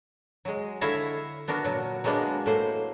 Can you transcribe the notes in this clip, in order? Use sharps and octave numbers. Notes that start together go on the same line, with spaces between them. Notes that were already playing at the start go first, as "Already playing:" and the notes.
F#3 G#3
D3 E4 C#5 E5 F5 A#5
B3 D4 F#4 A#4
A#2 F#3
F#3 G#3 A#3 B3 D4
A2 A3 A#3 C5